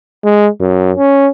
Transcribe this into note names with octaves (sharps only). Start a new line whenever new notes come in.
G#3
F#2
C#4